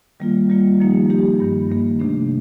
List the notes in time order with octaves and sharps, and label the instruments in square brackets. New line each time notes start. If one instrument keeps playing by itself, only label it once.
[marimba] D#3 G3 A#3 F4
D#3 G3 A#3 F4
F3 A#3 D#4 G4
F3 A#3 D#4 G4
G2 D#3 A#3
G2 D#3 A#3
C3 D#3 A3 D4